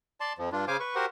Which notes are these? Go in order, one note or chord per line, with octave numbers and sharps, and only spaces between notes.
D5 A5 C6
F2 F3
G2 D4 F4
C#3 C5 F5 G#5 D6
B4 C#6
F#4 G4 A#4 C5 F#5